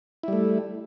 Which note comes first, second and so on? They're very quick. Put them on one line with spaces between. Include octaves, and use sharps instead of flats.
E4 G3 A3